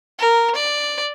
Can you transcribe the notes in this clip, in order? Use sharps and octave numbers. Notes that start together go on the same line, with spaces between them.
A#4
D5